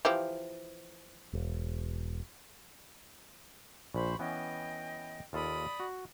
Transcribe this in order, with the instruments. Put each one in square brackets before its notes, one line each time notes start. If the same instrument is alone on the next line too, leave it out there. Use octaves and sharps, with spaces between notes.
[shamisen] E3 F3 G4
[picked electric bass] E1
[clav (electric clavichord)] A#1 [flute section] C5 B5 C#6
[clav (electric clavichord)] E3 B3 C#4 [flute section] D#5 G5
[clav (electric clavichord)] D#2 F4 A4 [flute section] D5 B5 D#6
[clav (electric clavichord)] F#4